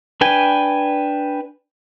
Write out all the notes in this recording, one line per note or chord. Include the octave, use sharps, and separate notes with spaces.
D4 B4 G5 G#5